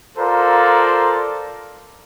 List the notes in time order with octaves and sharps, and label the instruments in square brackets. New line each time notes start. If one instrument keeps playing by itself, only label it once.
[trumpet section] F4 A4 A#4 C5 D5 A#5